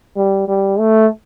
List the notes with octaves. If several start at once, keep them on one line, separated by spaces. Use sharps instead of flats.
G3
G3
A3